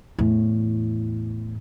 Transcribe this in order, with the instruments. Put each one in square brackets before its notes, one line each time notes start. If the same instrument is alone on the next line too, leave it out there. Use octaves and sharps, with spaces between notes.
[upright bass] E2 A2